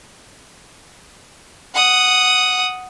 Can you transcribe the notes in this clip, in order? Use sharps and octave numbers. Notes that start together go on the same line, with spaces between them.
F#5 D#6